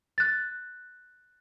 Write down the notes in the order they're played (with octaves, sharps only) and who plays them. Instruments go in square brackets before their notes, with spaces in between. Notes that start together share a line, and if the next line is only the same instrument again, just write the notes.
[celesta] F#6 A6